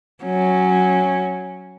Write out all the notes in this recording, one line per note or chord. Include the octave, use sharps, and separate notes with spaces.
F#3 C#4